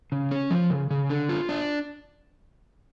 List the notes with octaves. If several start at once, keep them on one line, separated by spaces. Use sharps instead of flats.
C#3
C#4
F3
C#3
C#3
D3
F4
D4